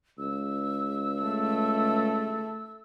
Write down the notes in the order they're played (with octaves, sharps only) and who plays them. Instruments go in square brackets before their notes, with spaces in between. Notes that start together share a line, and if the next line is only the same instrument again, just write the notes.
[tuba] C#2 [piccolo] E6
[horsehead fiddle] A3